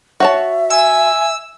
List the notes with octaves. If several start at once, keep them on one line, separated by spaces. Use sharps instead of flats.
F#4 C#5 E5 A5
G#5 E6